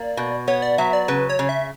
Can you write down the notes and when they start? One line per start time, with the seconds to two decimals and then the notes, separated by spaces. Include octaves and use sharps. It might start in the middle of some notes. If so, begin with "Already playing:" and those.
Already playing: A#3 D5
0.17 B2
0.48 B3 C#5
0.62 D5
0.78 F#3 E5
0.93 D5
1.08 C#3 B4
1.29 C#5
1.39 C#3
1.49 E5